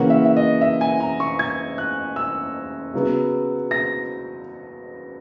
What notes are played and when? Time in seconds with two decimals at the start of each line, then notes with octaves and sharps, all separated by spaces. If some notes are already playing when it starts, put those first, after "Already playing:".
Already playing: C#3 E3 A#3 C#4 F#5
0.10 E5
0.25 E5
0.37 D#5
0.61 E5
0.81 G#5
1.00 A#5
1.20 C#6
1.39 G#6
1.78 F#6
2.16 E6
2.94 C#3 F#3 B3
3.71 A#6